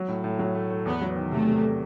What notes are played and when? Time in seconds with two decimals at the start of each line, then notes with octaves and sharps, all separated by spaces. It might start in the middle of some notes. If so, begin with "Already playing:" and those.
Already playing: F#3
0.08 A2
0.24 A2
0.39 F#3
0.55 A3
0.70 A3
0.86 E2 B3
1.01 F#3
1.16 D#3
1.32 C3 A3
1.47 C3